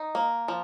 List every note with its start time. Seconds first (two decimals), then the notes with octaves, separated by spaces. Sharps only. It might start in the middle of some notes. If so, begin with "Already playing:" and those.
Already playing: D#4
0.15 A#3
0.48 F3